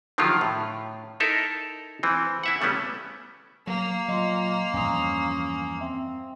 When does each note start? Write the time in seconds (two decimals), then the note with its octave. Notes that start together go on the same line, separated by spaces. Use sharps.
0.18 D3 D#3 F3 F#3 F4 G4
0.41 A2
1.20 D#4 E4 A4 A#4 E5
2.03 E3 C4
2.43 E4 E5 F#5
2.61 C#3 G3 A3 B3 C#4
3.67 F#3 A#3
4.08 A#2 F#3 D#5 C6
4.73 E2 G2 F3 C#4 A#5 C6 D#6
5.81 C4 E5